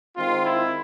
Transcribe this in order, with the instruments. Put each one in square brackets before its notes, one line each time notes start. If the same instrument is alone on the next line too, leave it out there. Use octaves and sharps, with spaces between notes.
[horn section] D#3 G#3 C4 F4
E4